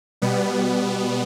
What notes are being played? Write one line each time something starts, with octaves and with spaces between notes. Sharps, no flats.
B2 G3 B3